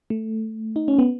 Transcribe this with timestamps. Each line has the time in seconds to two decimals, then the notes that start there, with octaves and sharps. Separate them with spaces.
0.10 A3
0.76 D#4
0.88 C#4
0.99 B3